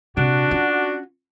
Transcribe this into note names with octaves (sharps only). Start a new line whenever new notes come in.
A#1 C3 D4 F#4
C#4 F4